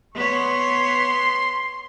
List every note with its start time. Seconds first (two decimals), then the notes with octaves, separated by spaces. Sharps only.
0.14 B3 C#5 C6